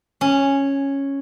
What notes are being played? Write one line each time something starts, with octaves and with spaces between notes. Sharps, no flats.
C#4